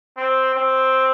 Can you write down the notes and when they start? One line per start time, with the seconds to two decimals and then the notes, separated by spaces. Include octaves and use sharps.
0.17 C4
0.55 C4